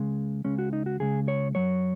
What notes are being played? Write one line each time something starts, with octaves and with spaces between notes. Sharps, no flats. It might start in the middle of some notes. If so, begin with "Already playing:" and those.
Already playing: C#2 C#3 G#3
C#2 C#3 G#3 C#4
F#4
D#4
F#4
C#2 C#3 G#3 G#4
C#5
F#2 F#3 C#5